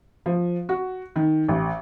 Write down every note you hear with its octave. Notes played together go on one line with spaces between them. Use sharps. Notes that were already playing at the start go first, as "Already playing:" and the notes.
F3
F#4
D#3
A1